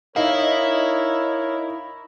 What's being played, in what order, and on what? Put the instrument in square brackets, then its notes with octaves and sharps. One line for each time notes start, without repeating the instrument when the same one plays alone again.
[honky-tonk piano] D#4 [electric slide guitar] E4 [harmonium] A#4 C#5 [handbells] F5